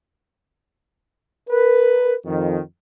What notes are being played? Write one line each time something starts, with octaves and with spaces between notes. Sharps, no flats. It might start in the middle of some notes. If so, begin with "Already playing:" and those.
A#4 B4
F2 D#3